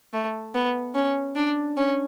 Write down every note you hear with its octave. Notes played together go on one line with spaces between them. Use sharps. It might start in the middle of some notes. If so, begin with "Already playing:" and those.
A3
B3
C#4
D4
C#4